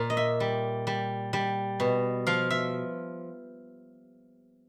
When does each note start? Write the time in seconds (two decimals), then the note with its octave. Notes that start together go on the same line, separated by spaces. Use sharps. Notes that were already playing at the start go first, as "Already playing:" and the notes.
Already playing: A#2
0.10 D#5
0.17 E5
0.40 G3
0.87 G3
1.33 G3
1.80 B2
2.27 F3 F5
2.50 E5